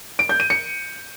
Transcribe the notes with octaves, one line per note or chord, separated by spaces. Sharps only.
D7
G6
D#7
C#7